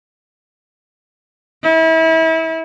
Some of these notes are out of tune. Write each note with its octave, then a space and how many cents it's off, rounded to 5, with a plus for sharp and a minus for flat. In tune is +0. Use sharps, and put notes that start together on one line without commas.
E4 -30